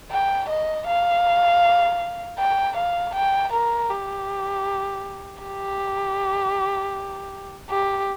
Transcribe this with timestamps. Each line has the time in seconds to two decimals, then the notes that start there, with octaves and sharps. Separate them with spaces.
0.11 G5
0.49 D#5
0.87 F5
2.39 G5
2.77 F5
3.15 G5
3.53 A#4
3.90 G4
5.42 G4
7.70 G4